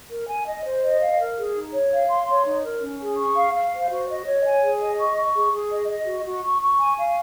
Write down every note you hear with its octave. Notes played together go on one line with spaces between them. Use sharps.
A#4
G#5
D#5
C5
D#5
F5
A#4
G#4
D#4
C#5
F5
C6
C#5
D#4
A#4
C#4
G#4
C#6
F5
F5
C5
F#4
D#5
C#5
G#5
G#4
D#5
C#6
C#6
G#4
G#4
D#5
D#5
F#4
F#4
C#6
C#6
G#5
F5